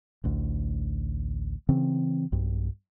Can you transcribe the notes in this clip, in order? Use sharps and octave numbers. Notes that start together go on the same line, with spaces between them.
A1 D2
C#3 E3 C4
B1 G2